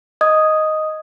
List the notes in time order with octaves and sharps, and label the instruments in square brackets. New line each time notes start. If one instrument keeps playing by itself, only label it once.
[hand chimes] D#5 D#6 G#6